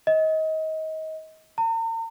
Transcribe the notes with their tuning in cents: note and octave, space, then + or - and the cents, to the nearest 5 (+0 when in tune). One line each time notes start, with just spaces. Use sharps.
D#5 +25
A#5 -45